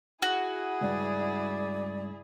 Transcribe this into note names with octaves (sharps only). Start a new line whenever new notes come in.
E4 F#4 G#4
C#2 G2 D5